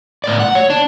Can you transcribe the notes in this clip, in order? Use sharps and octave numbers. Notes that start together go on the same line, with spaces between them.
A2 D5
F#5
C#5
D4